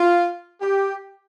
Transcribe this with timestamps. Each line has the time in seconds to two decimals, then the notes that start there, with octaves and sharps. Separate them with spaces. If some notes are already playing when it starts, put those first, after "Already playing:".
Already playing: F4
0.62 G4